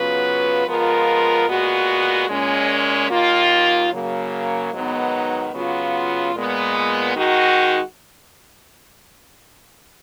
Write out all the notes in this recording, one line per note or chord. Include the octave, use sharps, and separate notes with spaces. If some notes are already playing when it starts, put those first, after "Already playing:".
Already playing: C#3 F#3 B3 F4 B4
F3 G#3 B3 F4 A#4
A#2 G#3 B3 F#4
A#2 G#3 C#4
D#2 D#3 A#3 F4
C#3 F#3 A#3
G#2 D#3 F#3 B3 D#4
C#3 F#3 B3 F4
A#2 G#3 B3
D#3 G#3 D#4 F#4